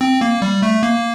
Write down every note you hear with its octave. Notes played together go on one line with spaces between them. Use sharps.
C4
A#3
G3
A3
A#3